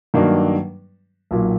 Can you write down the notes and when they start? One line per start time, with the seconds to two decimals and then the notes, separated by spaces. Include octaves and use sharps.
0.14 G2 D#3 F#3 A#3 D4
1.31 B1 A#2 F#3 A#3